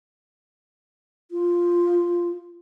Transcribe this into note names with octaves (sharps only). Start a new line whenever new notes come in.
F4